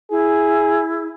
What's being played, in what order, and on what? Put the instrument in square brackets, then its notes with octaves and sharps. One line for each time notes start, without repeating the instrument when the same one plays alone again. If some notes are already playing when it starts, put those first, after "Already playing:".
[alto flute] E4 [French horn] G#4